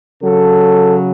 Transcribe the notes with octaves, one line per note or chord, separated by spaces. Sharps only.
C#3 F#3 A4